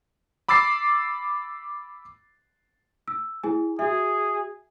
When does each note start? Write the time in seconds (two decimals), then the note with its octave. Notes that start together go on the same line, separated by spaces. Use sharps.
0.49 B5 D6 E6 A6 C7
3.08 E6
3.43 E4 G#4 G#5
3.79 F#4 G#4 E5